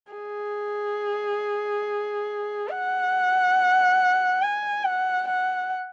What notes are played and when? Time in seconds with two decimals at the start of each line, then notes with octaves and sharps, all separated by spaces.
0.12 G#4
2.70 F#5
4.42 G#5
4.84 F#5
5.28 F#5